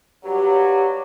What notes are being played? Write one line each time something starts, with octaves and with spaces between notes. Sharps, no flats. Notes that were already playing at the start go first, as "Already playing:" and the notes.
G2 F#3 G4